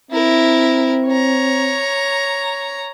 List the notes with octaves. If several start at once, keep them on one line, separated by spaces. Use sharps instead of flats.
C4 E4 A#4
C#5 A#5